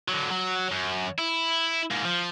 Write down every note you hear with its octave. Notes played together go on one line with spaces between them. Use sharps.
D3 F#3
F#3
F#2
E4
G#2 A#3
F3